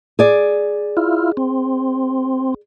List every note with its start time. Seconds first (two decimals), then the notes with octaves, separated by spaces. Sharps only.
0.19 G#4 D5
0.97 E4 F4
1.37 C4